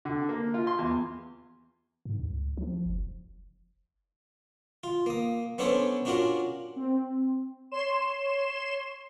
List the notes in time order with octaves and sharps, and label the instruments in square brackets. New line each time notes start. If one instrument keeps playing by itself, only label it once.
[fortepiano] D3
A#3
F4
C6
E2
[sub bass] G#2
C#2
F3
F#1
[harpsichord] F4
A#3 D#6
B3 C#4 D4 A4 C5 C#5
C#4 D4 F4 F#4 A#4
[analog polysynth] C4
C#5 C6 E7